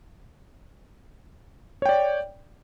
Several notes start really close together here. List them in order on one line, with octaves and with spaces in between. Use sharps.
C#5 G5 D5